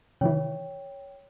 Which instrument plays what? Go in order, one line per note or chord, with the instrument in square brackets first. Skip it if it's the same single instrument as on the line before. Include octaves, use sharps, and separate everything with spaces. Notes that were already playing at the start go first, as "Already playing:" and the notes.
[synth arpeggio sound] C3 D#3 E3 [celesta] C#5 G5